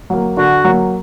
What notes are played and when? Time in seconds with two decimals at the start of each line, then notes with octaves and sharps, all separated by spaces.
0.10 F#3 A#3
0.37 D3 F#4
0.64 F#3 A#3